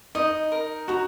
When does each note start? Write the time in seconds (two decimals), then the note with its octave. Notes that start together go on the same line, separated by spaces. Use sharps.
0.15 D#4 D#5
0.52 A#4
0.88 F#4 A#5